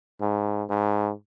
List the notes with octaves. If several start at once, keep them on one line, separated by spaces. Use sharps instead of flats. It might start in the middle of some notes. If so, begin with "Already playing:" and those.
G#2
G#2